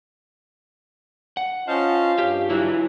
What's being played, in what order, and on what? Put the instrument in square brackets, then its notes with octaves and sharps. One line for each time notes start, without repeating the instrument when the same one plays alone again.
[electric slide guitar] F#5
[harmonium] C#4 D#5 A5 [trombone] F4 [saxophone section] C5 F5
[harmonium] G2 [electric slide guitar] G4
[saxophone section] E3 [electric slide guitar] F#3 E4